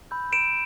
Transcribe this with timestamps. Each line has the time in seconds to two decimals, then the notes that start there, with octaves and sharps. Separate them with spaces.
0.11 B5 E6 G6
0.33 D7 E7